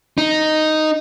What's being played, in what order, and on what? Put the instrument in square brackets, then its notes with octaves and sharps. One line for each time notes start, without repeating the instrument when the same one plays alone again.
[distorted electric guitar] D#4